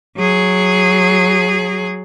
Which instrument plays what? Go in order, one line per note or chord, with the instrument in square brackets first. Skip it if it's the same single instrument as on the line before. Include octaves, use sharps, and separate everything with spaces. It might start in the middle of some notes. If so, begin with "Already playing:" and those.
[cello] F#3 G#4